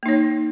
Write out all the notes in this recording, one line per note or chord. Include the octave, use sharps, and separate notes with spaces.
A#3 D#4 C#5